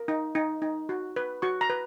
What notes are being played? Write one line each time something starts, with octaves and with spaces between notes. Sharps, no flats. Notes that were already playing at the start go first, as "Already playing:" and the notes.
Already playing: A#4
D#4
D#4
D#4
F#4
B4
F#4 C#6
A#5
B4